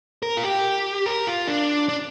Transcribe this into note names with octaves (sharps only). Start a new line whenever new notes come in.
A#4
F4
G4
A#4
F4
D4
D4